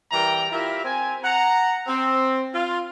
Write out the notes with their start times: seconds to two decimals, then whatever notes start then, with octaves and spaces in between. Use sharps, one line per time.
0.12 E3 G3 A#4 D5 G5 A#5
0.52 E4 F4 G4 A#4 E5
0.84 C4 G#5
1.23 F#5 A#5
1.87 C4
2.54 F4